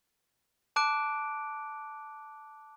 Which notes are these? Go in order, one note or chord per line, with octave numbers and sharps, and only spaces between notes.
A5 D6 F#6 D7